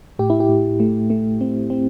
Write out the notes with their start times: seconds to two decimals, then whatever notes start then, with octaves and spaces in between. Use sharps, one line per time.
0.19 A2 G4
0.30 E4
0.40 G4
0.49 A2
0.80 A3
1.10 A3
1.41 C4
1.70 C4